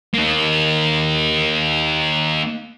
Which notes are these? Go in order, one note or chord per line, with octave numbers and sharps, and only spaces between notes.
A#3 D#4